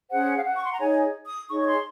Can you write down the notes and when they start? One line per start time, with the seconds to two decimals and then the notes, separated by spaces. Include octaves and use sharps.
0.11 C#4 G#4 C5 F#5
0.37 F5
0.46 F#5
0.57 C#6
0.64 C6
0.72 A#5
0.80 D#4 G#4 C#5 G#5
1.26 D#6
1.49 D#4 G#4 C#5 C#6
1.62 C#6
1.67 C6